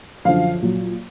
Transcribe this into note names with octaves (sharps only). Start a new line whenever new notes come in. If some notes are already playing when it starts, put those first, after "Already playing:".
F#2 D3 F3 F5
A#2 F#3